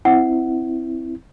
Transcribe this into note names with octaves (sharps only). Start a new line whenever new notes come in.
C4 E4 F#5